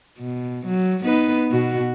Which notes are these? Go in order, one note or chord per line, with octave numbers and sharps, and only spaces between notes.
B2
F#3
B3 D#4 B4
B2 F#4